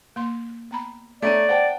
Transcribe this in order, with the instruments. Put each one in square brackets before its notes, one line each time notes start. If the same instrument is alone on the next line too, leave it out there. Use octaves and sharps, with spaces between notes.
[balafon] A#3 C6
B3 A#5 B5
[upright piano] A3 A#5 D#7 [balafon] B3 D4 C#5 [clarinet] D5
[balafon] C5 [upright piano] F#5 G5 A5